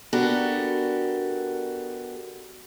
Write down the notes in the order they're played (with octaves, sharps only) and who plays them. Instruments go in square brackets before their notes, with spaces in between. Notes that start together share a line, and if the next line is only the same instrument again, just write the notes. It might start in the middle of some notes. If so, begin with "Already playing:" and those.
[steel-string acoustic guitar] B3 D4 F#4 G4 A4 A#4